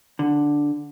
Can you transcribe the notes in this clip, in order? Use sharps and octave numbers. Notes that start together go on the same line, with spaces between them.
D3